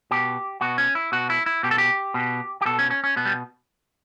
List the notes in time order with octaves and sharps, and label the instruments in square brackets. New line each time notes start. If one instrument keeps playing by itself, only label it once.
[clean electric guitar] B2 G4
B2 F#4
C#4
E4
B2 F#4
E4
E4
B2 G4
A4
G4
B2
G4
B2 A4
C#4
C#4
C#4
B2 B3
G3